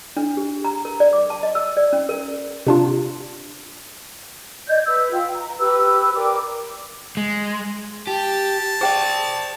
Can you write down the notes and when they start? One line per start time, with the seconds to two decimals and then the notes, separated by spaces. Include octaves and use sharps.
0.17 D4
0.37 G4
0.65 A#5
0.85 A#4
1.00 D5
1.13 D6
1.30 A5
1.43 D#5
1.55 E6
1.77 D5
1.93 C#4
2.09 A#4
2.67 C3 D4 F4
4.67 D5 D#5 G6 G#6
4.86 B4 E6
5.12 F4 G5
5.35 A#5
5.59 G4 B4 E6
6.14 A#4 D5 G5 D6
7.17 G#3
8.07 G4 A5
8.81 G#4 C5 D5 G5